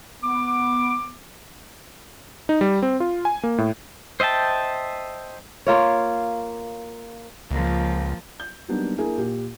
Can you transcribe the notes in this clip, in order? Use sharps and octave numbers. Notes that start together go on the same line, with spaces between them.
B3 D6
D#4
G3
C4
F4
G#5
A#3
A2
C5 D#5 E5 G5 A5
A#3 F4 C#5
C#2 F3 A#3
G6
F#3 G3 A#3 B3 D4 D#4
A#3 D4 E4 G#4 A#4 G#5
A#2 G4